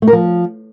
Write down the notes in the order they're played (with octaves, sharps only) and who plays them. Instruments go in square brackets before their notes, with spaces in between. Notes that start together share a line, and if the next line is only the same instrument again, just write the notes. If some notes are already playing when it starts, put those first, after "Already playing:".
[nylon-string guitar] A3
A#4
F3